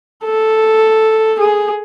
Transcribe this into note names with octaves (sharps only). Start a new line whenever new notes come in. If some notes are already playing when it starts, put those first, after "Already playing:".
A4
G#4